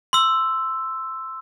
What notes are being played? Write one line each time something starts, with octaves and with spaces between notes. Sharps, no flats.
C6 E6